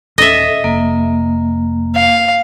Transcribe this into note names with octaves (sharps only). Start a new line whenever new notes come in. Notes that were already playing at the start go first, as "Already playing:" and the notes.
D#1 C#4 A4 D#5 E5
F1 A#3
F5